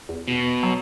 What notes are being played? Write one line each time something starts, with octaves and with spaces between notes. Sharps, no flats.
E2
B2
F#3